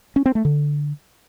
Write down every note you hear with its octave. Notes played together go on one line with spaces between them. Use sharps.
C#4
C4
A3
D3